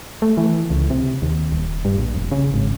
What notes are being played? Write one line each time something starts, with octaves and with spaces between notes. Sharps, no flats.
A3
E3
C#2
C3
D#2
D#1
G2
A#1
F1
C#3
G#1